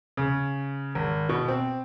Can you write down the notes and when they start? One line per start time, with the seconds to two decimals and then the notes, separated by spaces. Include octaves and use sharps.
0.17 C#3
0.95 G#1
1.29 B2
1.48 C4